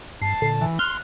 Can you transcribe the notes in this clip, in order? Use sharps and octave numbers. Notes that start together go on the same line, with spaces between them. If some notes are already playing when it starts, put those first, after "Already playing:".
G2 A5 C7
A#2 D3
E3
C6 F6 F#6